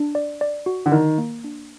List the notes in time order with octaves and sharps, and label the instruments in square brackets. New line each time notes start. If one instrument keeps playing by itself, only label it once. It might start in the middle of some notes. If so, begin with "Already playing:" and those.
Already playing: [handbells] D4
D5
D5
F#4
[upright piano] D3
[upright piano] D#3 [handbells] A#4
[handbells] A#3
D4